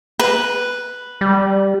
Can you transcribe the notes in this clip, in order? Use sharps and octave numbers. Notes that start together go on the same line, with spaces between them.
B4
G3